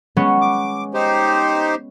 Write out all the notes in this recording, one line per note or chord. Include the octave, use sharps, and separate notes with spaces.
G#3 B3 C#4
D6
D#4 G4 C5